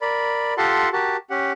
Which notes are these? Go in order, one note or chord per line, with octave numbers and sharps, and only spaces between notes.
A#4 D5 B5
F4 G4 A4 F#5 A5 C6
F#4 G4 A#4 A5
C#4 G4 F#5